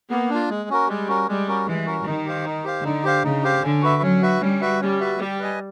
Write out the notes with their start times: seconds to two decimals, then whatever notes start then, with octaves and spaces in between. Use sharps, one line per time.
0.10 A#3 B3
0.30 D4 F4
0.50 G#3
0.69 C#4 F#4 A#4
0.88 G3 G#3
1.08 C#4 F#4 A#4
1.28 G3 G#3
1.47 C#4 F#4 A#4
1.67 E3 G#3
1.86 C#4 F#4 A#4
2.06 D#3 D#4
2.25 G4 C5 F5
2.46 D#4
2.64 G4 C5 F5
2.84 D3 D#4
3.04 G4 C5 F5
3.24 C#3 D#4
3.43 G4 C5 F5
3.63 D3 C#4
3.82 F#4 B4 E5
4.02 F#3 C#4
4.22 F#4 B4 E5
4.41 G3 C#4
4.61 F#4 B4 E5
4.81 G3 C#4
5.00 F#4 B4 E5
5.19 G3 G4
5.39 B4 D#5 G#5